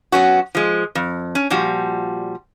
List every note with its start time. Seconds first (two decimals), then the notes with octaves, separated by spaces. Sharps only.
0.12 F#3 B3 C#4 F#4
0.55 F3 G#3
0.95 F2
1.35 C#4
1.50 A#2 F3 G3 F#4